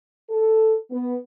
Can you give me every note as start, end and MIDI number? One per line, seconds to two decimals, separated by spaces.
0.29 0.74 69
0.90 1.14 59